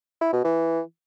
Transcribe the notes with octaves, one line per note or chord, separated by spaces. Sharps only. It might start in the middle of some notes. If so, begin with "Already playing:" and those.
E4
B2
E3